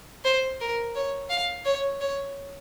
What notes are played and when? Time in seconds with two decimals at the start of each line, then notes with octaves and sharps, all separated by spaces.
0.25 C5
0.61 A#4
0.95 C#5
1.30 F5
1.65 C#5
2.01 C#5